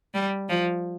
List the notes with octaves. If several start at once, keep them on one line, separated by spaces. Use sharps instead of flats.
G3
F3